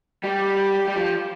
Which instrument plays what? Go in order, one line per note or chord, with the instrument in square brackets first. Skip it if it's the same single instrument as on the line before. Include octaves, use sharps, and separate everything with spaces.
[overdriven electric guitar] G3 [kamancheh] G4
[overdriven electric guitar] G3
F3